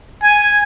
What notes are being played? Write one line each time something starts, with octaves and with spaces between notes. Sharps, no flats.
G#5